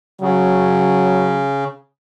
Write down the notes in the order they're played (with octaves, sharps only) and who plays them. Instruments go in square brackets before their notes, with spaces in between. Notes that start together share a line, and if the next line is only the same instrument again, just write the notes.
[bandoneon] C#3 [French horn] F#3